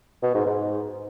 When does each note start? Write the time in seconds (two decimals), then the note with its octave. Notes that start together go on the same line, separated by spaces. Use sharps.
0.23 B2
0.35 G#2
0.47 G#2